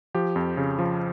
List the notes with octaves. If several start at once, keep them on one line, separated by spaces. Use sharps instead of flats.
F3 G4
F2
C#3
F3